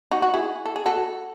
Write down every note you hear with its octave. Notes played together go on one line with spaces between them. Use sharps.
D#4 F#4
F#4
E4 G#4
A4
G#4
F#4 A4